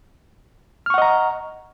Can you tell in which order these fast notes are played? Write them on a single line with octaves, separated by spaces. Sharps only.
F6 C#6 F#5 D#5 A#5